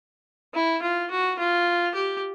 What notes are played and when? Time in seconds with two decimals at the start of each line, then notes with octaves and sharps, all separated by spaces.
0.54 E4
0.82 F4
1.11 F#4
1.39 F4
1.95 G4